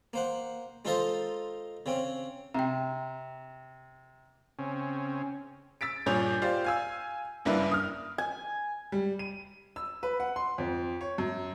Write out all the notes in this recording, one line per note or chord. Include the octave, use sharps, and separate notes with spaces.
A#3 C5 F#5
G#3 D#4 F4 A4 C5 D#5
C#3 C4 C#4
C3 G5 A#5
C#3 C4 C#4
E6 A6 B6 D7
G2 A#2 G#4 C#5 G6 F7
F4 G4 C5 D5
F5 G#5 E6
F#1 G2 A#3 D4 E4 B4
D#6 F6
G#5
G3
D#7
E6
B4
F#5
C6
F2
C#5
F#2